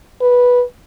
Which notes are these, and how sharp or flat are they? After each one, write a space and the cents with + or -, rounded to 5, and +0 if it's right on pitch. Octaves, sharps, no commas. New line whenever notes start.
B4 -10